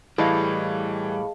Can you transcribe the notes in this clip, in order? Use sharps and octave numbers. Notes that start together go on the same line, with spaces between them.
A2 E3 G3 G#4 D#5 F5